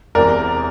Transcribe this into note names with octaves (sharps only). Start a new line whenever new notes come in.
E1 E2 C3 E3 A#4 D5